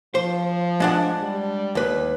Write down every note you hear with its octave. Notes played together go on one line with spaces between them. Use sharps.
F3 C5
G#3 D4 F#5
G3
D#2 B4